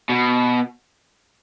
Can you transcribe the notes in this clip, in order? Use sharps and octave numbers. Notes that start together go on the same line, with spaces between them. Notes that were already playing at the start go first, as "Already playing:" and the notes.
B2